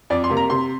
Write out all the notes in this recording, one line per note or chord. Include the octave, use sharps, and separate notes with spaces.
F2 D5
C6
C3 A#3
A#5
C3 C6